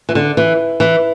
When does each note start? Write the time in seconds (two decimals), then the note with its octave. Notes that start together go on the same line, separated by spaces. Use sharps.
0.09 E3
0.15 D3
0.37 E3
0.80 E3